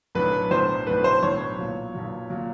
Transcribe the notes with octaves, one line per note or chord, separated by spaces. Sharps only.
B1 A2 F#3 B3 D4 B4
B1 A2 F#3 B3 D4 C5
B1 A2 F#3 B3 D4 B4
C5
B1 A2 F#3 B3 D4 C#5
B1 A#2 F#3
B1 A#2 F#3
A#2 F#3